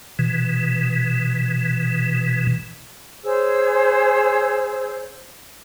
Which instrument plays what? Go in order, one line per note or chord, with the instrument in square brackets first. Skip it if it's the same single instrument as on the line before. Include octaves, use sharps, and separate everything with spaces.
[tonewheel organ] B2 E3
[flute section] G#4 C5 C#5 E6